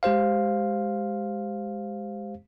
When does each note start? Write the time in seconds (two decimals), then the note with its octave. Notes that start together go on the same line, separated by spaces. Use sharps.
0.03 G#3 G4 C5 F5